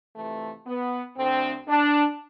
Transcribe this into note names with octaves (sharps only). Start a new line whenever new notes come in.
F2 C3 E3 A3
B3
D2 D3 C4
D4